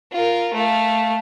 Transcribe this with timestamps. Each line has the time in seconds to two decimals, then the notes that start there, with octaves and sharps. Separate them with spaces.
0.12 F4 A#4
0.54 A3 F5